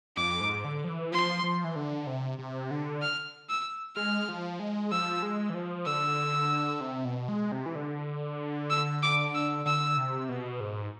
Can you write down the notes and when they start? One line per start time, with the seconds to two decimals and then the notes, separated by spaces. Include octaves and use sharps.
0.17 F2 D6
0.41 G#2
0.65 D3
0.84 F3
0.88 E3
1.12 F3 C6
1.43 F3
1.64 E3
1.76 D3
2.07 C3
2.39 C3
2.71 D3
3.02 F6
3.49 E6
3.96 G#3 F6
4.29 F3
4.60 G#3
4.91 F3 E6
5.22 G#3
5.50 E3
5.54 F3
5.86 D3 E6
6.81 C3
7.05 B2
7.29 G#3
7.52 C3
7.66 E3
7.75 D3
8.70 E6
9.03 D6
9.35 E6
9.65 D3 E6
9.97 C3
10.29 B2
10.60 G#2